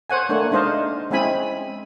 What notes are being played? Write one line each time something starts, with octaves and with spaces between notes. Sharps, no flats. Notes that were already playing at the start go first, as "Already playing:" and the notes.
C5 C#5 F#5 G#5
A3 A#3 D4 C#5
G#3 D4 D#4 C5 D#5 F5
G#3 C4 C#4 E4 G#5 B5